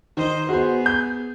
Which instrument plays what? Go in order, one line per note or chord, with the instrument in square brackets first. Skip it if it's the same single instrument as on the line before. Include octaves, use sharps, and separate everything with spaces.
[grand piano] D#3 D#4 [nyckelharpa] C5 D#5
[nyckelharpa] B3 G#4 [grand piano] F#4 C5
[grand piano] G6